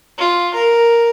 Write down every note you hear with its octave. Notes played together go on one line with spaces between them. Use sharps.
F4
A#4